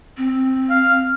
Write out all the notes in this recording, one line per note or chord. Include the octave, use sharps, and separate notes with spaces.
C4
F5